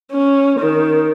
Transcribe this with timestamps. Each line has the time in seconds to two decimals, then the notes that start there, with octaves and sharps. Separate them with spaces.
0.12 C#4
0.60 D#3